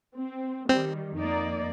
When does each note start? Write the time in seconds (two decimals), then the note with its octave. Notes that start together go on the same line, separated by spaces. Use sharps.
0.15 C4
0.69 D#3 G3 C4
1.16 F2 A#3 D#4 D5